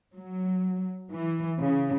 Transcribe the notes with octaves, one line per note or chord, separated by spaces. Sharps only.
F#3
E3
C#3